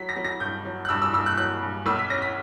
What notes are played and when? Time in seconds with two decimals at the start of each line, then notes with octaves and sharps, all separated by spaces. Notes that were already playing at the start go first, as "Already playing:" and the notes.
Already playing: F#3 B6
0.09 A#6
0.16 F#3
0.24 A#6
0.40 G2 G6
0.65 F#3
0.85 F#6
0.89 G2 E6
1.02 E6
1.13 G2 E6
1.26 F#6
1.37 F#3 F#6
1.63 G2
1.86 B1 E6
1.99 B6
2.10 C#4 A#6
2.22 B6